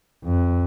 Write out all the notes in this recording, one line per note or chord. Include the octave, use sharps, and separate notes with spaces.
F2